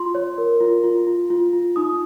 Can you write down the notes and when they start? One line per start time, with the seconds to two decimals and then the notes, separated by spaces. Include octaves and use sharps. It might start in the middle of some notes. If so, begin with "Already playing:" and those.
Already playing: F4 C6
0.15 C#5
0.38 A#4
0.61 F4
0.84 F4
1.07 F4
1.30 F4
1.53 F4
1.76 D#4 D#6